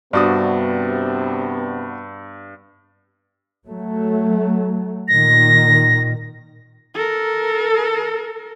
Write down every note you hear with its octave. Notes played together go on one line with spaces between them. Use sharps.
G2 C3 B3 D4 F#4 D#6
F#3 A3
A#2 D#3 A#6
A4 A#4